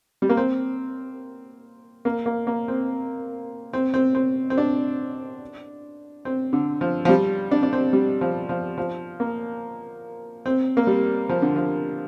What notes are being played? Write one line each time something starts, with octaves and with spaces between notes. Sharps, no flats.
G3
A#3
C4
A#3
A#3
A#3
C4
C4
C4
C4
C4
D4
C4
D3
F3
F3
G3
D4
D4
C4
G3
F3
F3
F3
A#3
C4
A#3
G3
F3
D3
F3